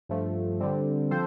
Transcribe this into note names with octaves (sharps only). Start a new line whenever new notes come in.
G2 F3 A3
D3 G3 C4
F3 C4 A4 C5